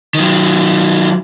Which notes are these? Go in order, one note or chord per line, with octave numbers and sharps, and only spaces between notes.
D#3 F#3